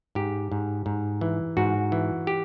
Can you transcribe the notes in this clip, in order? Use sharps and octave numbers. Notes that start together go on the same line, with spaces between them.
G#2 G4
G#2
G#2
E3
G#2 F#4
E3
G4